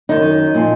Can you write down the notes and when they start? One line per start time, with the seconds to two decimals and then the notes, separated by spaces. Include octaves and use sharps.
0.09 F#2 D#3 D#4
0.54 A#2 F3